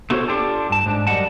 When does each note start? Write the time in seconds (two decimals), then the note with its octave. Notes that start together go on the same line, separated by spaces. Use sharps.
0.10 A3 B3 F#4 A4 C5 C#5
0.28 D4 F4 G4 A4
0.70 G2 A5
0.86 G#2 D4
1.07 F#2 G3 D5 D#5 F#5 A5